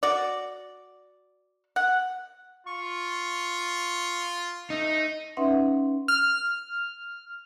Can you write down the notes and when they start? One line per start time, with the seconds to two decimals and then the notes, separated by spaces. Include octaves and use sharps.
0.03 F#4 D5
1.76 F#5
2.67 F4 C#6
4.70 A3 D#4
5.37 C#4 D#4 B4 E5 F#5 C6
6.08 F6